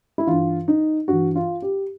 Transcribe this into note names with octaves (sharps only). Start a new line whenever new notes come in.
E4
G2 E3 F4
D#4
G2 E3 F#4
F4
G4